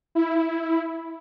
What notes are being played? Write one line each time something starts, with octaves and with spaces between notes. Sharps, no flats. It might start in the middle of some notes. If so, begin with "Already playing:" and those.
E4